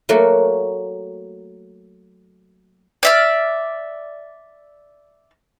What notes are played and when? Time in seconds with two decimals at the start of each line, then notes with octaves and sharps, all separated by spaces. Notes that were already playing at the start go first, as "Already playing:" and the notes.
0.09 F#3 A3 A#3 F#4
3.03 D5 E5 F6